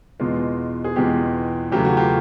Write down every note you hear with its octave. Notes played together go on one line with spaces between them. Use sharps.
E2 B2 G#3 F4
G#4
E2 B2 G#3 F4 G4
E2 C#3 F#3 A3 G4
F#4
F4 G4